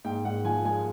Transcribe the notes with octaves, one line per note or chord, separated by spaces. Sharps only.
G#2 G5
G#2 F#5
F3 G#5
G#3 G#5